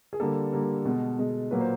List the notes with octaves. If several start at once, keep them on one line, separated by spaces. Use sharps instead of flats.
G#4
D3 G3 A#3 A4
D3 G3 A#3
B2 G#3
B2 G#3
A#2 F#3 A#3 B4
C5